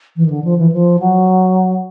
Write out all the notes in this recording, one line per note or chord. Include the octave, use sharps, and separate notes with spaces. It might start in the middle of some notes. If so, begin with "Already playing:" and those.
E3
D#3
D3
F3
E3
F3
F#3